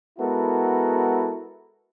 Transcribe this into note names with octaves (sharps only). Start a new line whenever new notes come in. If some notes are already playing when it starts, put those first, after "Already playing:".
G#3 B3 E4 F#4 A4 A#4